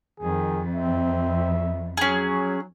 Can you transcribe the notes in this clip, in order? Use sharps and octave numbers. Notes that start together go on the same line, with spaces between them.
F2 D#3 G#4
C4 E5
F#3 C#4 G#4